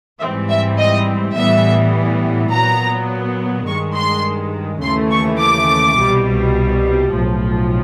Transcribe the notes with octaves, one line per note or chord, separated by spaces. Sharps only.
G#2 E3 G3 C4 E5
E5
D#5
A2 E3 G3 B3 E5
A#2 F#3 B3 A#5
G2 D#3 G#3 C#6
C6
D#2 C#3 E3 A3 C6
C#6
D6
C2 B2 G3
B1 A2 F3